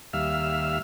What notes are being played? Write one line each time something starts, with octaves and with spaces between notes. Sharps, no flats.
D#2 G3 E5 F5 E6 F6